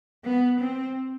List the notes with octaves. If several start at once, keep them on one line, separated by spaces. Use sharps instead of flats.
B3
C4